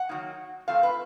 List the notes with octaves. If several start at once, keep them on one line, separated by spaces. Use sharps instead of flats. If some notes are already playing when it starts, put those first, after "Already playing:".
Already playing: F#5
D#3 F#3 A#3 D#4
F3 A3 C4 F4 F5
B4